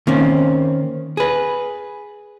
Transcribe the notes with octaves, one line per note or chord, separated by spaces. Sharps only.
D#3 A#3 C4 C#4
G#4 B4